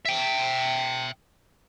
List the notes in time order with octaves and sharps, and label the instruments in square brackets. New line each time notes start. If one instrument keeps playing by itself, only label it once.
[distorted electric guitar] E5 G5